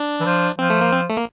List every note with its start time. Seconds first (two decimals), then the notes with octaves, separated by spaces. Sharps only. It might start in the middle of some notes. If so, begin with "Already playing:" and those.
Already playing: D4
0.20 E3
0.26 F3
0.59 F3 C4
0.70 A3
0.81 A#3
0.93 C4
1.10 A3
1.17 A#3